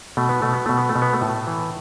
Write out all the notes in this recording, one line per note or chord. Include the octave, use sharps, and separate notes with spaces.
B2 A3
B3
B2 A3
B3
B2 A3
B3
A3
B2
B3
A3
A2
E3